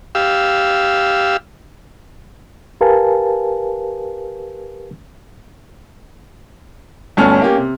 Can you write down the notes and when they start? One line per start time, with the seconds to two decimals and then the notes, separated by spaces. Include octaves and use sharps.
0.15 G4 F5 E6
2.81 G4 A#4 B4 F5 G#5 A5
7.17 G1 D2 C#4 A4 F6
7.42 A#3 C#4 G4
7.57 C3